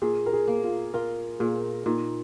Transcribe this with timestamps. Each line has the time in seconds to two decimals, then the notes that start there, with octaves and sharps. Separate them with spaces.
0.02 A#2 G#4
0.26 A#4
0.33 G#4
0.48 A#3
0.64 F4
0.93 F4 A#4
1.40 A#2 G#4
1.86 A#2 D#4